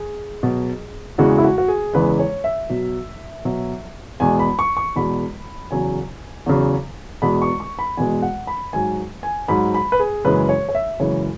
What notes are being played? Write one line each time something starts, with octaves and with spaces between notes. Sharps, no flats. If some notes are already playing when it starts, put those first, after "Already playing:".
Already playing: G#4
B2 F#3
E2 C#3 E3 G#3 F#4
E4
F#4
F#4
G#4
E2 C#3 E3 G#3 B4
C#5
E5
B2 F#3
B2 F#3
E2 B2 G#3 G#5
B5
C#6
C#6
E2 B2 G#3 B5
E2 C#3 F#3 G#5
E2 C#3 F#3
E2 B2 G#3 B5
C#6
C#6
B5
E2 B2 G#3 G#5
F#5
B5
G#2 F#3 G#5
G#5
G#2 F#3 B5
B5
B4
G#4
F#2 C#3 E3 G#3 B4
C#5
C#5
E5
F#2 C#3 E3 G#3 C#5